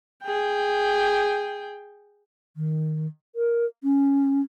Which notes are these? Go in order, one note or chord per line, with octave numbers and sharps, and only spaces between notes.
G#4 G5
D#3
A#4
C#4